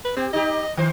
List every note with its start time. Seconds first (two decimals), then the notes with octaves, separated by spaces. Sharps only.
0.05 B4
0.17 C4 G4
0.33 D#4 G4 D#5
0.77 D#3 C5